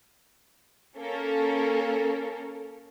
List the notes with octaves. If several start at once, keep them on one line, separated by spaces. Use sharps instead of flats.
A#3 C#4 A4 A#4